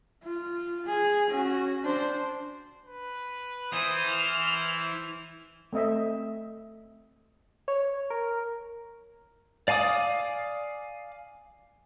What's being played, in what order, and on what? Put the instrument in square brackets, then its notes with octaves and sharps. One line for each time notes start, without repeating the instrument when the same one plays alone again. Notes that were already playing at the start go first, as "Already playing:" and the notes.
[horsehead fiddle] F4
G#4
C#4 F#4
D4 C5
[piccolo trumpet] B4
[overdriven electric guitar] E3 [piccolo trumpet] C5 [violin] D#6
[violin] F6
[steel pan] A3 C4 D#5 E5
[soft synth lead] C#5
A#4
[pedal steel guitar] D5 F5 G#5 D6 D#6